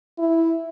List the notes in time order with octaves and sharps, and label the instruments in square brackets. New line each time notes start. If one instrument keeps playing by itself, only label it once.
[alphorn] E4